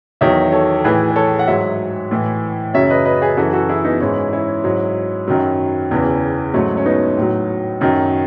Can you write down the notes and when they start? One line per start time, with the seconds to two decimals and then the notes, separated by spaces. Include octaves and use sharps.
0.21 E2 D#3 F#3 C#5 E5
0.52 A4 C#5
0.77 A4
0.84 A2 E3 G#4 B4
1.10 B4
1.16 A4 C#5
1.39 F#5
1.47 G#2 F#3 C#5 E5
2.11 A2 E3
2.74 F#2 C#3 F#3 C#5 E5
2.90 B4 D#5
3.05 B4 D#5
3.22 G#4 B4
3.37 F#2 E3 F#4 A4
3.53 F#4 A4
3.69 E4 G#4
3.84 B3 D#4
4.00 G#2 E3 C#4 E4
4.33 C#4 E4
4.64 G#2 F#3
5.28 F#2 D#3 F#3
5.91 E2 C#3 E3
6.54 G#2 F#3 A3 C#4
6.77 C#4
6.85 B3 D#4
7.17 A2 F#3
7.81 F#2 D#3 F#3